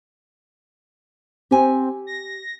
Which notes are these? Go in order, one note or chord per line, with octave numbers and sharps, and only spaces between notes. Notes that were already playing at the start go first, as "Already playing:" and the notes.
C4 G4 G#5
A#6